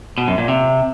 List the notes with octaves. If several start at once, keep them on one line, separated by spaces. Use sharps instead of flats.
B2
F#2
A#2
C3